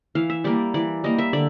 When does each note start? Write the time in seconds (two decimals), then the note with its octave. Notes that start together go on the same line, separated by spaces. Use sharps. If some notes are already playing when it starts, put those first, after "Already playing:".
0.15 E3 F5
0.30 E5
0.44 G3 A#3 D5
0.74 E3 D5
1.04 G3 A#3 D#5
1.18 E5
1.33 D3 D5